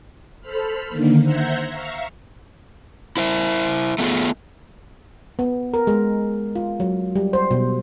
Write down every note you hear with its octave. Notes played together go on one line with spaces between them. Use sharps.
A4 C5 B5 F6
D3 D#3 A#3
C5 E5 F#5 A#5 G6 G#6
E5 F5 A#5 C#6
E4 C5 E5
A3 B3 F4 G#4
B3
A#4
G#3
F4
F#3
G3
C5
B2